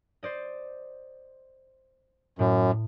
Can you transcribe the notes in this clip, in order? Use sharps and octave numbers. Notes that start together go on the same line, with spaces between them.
C5 D5 D#5
F#2 A2